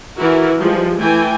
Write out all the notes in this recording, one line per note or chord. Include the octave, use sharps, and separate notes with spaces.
E3 E4 F#4 A#4
F3 G3 G#3
E3 A3 G5 G#5